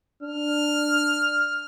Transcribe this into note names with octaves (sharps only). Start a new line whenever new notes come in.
D4 F6